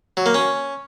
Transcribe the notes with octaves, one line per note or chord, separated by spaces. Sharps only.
F#3
A#3
C#4